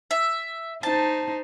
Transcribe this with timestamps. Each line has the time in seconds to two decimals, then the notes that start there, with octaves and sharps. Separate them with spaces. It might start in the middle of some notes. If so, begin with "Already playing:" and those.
0.11 E5
0.83 D#4 C5 A5